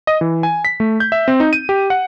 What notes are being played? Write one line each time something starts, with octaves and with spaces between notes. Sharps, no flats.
D#5
E3
G#5
B6
A3
G6
E5
C4
D#4
D#7
G4
F#5